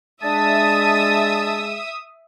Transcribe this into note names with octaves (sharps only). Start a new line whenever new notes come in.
G#3 D4 E5 A5 D#6 E6